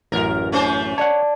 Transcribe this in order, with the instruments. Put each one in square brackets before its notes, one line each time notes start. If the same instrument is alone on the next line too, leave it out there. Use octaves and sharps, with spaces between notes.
[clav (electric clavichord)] A1 F#2 [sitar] A#4
[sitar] A3 C#4 C5
[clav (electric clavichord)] C#5 F#5 [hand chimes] D5 A5